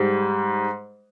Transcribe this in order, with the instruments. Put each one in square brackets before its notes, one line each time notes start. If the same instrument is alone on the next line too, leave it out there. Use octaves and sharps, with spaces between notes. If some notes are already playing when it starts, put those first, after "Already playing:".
Already playing: [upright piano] G#2 G3